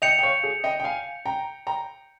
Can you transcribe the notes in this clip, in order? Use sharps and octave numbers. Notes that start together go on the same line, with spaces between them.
D#5 G5 G6 C#7 F7
G5
C#5 F5
G#4
D#5 G5
G5
F5 G#5
G5 A#5
G5 A#5